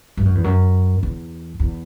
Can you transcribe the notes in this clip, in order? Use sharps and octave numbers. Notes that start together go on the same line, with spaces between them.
G2
F#2
E2
F#2
E2
E2